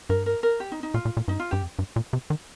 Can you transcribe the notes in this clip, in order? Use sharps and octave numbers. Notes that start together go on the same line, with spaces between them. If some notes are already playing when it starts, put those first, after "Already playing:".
G2 A#4
A#4
A#4
G4
D#4
D#4
A#2 F4
A#2
A#2
G2 D#4
F4
G2 G4
F2
G2
A#2
C3
D#3